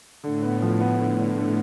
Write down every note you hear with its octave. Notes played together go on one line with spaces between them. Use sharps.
A2 D3
B3
F3
B3
D3
D3
D3